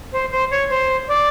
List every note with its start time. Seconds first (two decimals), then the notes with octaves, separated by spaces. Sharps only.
0.12 C5
0.31 C5
0.51 C#5
0.70 C5
1.08 D5